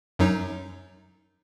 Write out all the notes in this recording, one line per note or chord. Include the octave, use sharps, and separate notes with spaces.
F#2 F#3 D#4